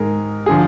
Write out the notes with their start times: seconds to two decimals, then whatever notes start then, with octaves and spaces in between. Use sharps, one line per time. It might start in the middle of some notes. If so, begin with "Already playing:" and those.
Already playing: G#2 D#3 G#4 A#4
0.46 G#4
0.49 D3 F3